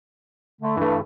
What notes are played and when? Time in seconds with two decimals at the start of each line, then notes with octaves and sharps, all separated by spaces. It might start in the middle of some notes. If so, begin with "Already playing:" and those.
0.61 D3 A3
0.77 G2 E3 A3